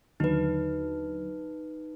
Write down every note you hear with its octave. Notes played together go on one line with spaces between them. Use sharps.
D#2 D3 F#3 D#4 B4